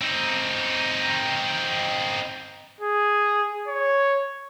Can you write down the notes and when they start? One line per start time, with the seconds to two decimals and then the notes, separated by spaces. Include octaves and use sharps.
0.02 C4 D#4
2.81 G#4
3.68 C#5